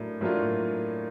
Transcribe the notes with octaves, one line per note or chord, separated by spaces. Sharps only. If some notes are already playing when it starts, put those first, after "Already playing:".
Already playing: A2 F#3 A#3 D4
A2 F#3 A#3 D4 F4